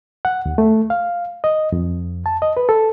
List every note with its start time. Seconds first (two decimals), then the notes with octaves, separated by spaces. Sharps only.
0.25 F#5
0.46 D#2
0.58 A3
0.90 F5
1.44 D#5
1.72 F2
2.26 A5
2.42 D#5
2.57 B4
2.69 A4